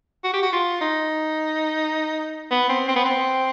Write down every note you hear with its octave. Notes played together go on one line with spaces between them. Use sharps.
F#4
G4
F#4
F4
D#4
B3
C4
C4
B3
C4